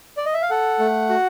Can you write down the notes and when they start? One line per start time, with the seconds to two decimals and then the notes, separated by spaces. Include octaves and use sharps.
0.17 D5
0.26 D#5
0.34 E5
0.42 F5
0.50 A4 F#5
0.79 A3
1.09 F#4